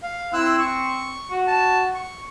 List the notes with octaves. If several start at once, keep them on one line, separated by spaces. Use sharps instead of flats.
F5
C4 E4 E6 F#6
C#6
F#4
A5
C#6